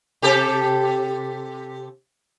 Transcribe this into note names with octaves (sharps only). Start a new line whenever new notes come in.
C3 G4 A4